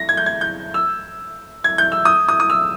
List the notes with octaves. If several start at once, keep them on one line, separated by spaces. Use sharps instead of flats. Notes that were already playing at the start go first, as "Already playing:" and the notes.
Already playing: A#6
G#6
G6
G#6
G6
E6
G#6
G6
E6
D#6
D#6
D#6
E6